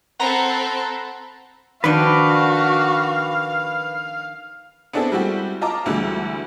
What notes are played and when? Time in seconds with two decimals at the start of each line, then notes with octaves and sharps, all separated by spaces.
0.20 C4 A4 F#5 A#5 B5
1.84 D#3 F3 D4 F#4 B4 D5 F5 G5
4.93 B3 C4 D4 E4 G#4 A4
5.12 G3 G#3 C4 E4 F#4 G4
5.61 F4 D#5 A5 A#5 D6
5.86 D2 D3 E3 G3 G#3